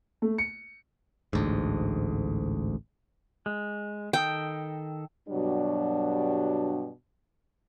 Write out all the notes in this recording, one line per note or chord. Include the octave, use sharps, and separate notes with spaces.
A3
C#7
A1 D2 G#2
G#3
D#3 A4 D#5 G5
G2 B2 F#3 G3 D4